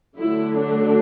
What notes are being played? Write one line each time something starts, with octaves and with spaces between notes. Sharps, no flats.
D3 F#3 A3 E4
D4